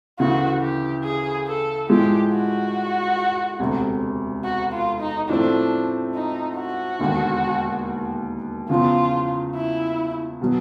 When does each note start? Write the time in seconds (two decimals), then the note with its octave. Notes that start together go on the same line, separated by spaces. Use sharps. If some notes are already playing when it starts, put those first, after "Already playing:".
0.19 D2 C#3 E3 F#4
0.61 G4
1.04 G#4
1.47 A4
1.89 A2 F3 G#3 G4
2.31 F#4
3.59 E1 D2 C3
4.44 F#4
4.72 F4
5.00 D#4
5.29 A2 F3 A3 C4 D4
6.15 D#4
6.57 F#4
6.99 E1 D#2 D3
8.69 E2 C#3 F3 F4
9.54 E4
10.41 B2 F#3